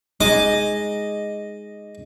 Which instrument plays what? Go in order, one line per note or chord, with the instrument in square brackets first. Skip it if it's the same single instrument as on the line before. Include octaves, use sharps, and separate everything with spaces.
[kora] G#3 D#4 G#4 [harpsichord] D#5 D6